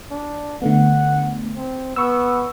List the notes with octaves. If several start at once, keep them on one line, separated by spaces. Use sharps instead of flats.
D4
D3 A3 B3 F#5
C4
B3 C#6 E6